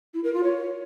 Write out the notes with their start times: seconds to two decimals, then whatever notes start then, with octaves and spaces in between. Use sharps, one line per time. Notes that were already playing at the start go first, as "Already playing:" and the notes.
0.13 E4
0.23 A#4
0.33 F4
0.43 C#5